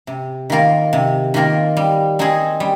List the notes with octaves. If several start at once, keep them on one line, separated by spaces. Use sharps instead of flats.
C3
D#3 A#3 F4 A#4
C3
D#3 A#3 F4 A#4
G3
C4 D#4 G#4
G3